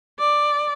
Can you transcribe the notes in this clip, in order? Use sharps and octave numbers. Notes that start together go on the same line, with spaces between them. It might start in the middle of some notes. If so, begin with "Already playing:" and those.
D5